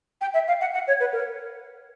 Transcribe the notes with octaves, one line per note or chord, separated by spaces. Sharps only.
G5
E5
F5
F#5
F#5
C#5
B4
A#4